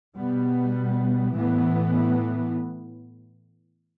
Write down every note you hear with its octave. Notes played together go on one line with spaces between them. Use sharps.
B2 G3 B3
A2 E3 B3